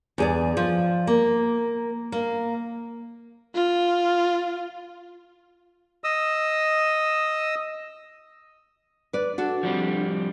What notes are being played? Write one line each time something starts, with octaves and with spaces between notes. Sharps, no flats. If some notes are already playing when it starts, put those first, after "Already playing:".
E2 G#4 D5
F3
A#3
A#3
F4
D#5 D#6 E6
B4 D5
D4 F#4 A4
F3 G3 C4